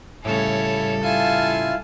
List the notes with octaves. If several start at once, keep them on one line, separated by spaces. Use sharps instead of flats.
A2 C#3 G3 E4 A4 C#5
E4 F4 F5 G#5 A5